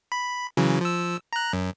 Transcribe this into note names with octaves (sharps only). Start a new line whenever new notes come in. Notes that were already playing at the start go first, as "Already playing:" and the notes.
B5
C#3 E3 F#3
F3 E6
A#5 F#6
F#2